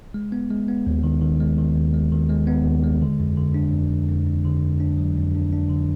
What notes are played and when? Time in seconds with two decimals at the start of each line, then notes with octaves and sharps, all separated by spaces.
0.14 G#3
0.32 B3
0.50 G#3
0.68 B3
0.87 D#2
1.04 D#3
1.21 D#3
1.40 G#3
1.58 D#3
1.76 D#2
1.94 G#3
2.12 D#3
2.29 G#3
2.47 B3
2.65 D#2
2.84 G#3
3.02 D3
3.19 F2
3.37 D3
3.54 D4
3.73 F2
3.91 F2
4.08 F2
4.27 F2
4.45 D3
4.62 F2
4.80 D4
4.98 F#3
5.17 F2
5.35 D4
5.53 D4
5.70 D3